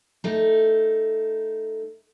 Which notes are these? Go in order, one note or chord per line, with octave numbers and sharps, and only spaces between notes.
A3 D#4